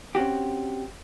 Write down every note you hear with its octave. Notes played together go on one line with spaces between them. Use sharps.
C4 C#4 F#4 G4